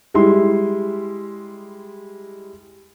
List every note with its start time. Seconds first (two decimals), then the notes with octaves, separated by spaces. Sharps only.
0.14 G3 G#3 E4 C6